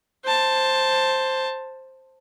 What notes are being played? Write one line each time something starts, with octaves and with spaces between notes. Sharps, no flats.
C5 A5